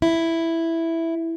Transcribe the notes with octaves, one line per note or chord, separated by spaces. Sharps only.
E4